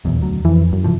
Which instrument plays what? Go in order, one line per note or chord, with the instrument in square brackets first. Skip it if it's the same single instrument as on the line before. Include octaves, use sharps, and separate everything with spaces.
[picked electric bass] D#1 B1 E2
D2 F#3
[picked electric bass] F2 [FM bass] E3
[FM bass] F#2
[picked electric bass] C3 E3 F3